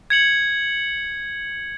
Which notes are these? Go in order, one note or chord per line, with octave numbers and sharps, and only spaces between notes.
G#6 C#7 F#7